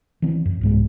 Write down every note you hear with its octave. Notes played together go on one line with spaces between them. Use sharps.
E3 C4
F#2
C2 G#2 G#3